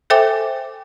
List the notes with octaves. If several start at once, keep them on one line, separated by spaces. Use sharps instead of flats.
A4 C5 E5 G5 G#5 D6